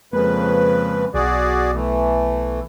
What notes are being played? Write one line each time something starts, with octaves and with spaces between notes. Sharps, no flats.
F2 C#3 G#3 A#3 B4
B1 F#4 G#4 D5
E3 A3